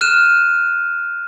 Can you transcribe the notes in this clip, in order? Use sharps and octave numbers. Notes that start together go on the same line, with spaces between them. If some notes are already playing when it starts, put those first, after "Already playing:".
F6 F#6 D#7 E7